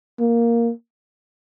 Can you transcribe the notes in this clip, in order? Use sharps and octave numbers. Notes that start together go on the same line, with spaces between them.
A#3